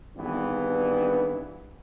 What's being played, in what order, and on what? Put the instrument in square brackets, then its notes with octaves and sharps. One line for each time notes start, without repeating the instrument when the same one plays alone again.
[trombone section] G#1 G2 E3 G3 B3